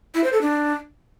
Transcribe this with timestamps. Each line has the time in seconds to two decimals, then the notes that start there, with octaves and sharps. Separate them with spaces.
0.15 E4
0.24 C5
0.33 A4
0.42 D4